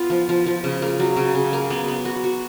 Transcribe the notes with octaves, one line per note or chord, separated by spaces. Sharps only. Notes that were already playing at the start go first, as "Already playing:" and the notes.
Already playing: B3 F4
F3
F3
F3
C#3
A#3
F#3
C#3
C#3
A#3
B3
B3
F#4
F#4